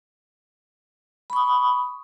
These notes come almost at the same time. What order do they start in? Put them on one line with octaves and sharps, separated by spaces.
B5 C#6 D#6